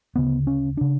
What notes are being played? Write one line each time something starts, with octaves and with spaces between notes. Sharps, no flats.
D2 C#3 B3
C#4
C#3 D4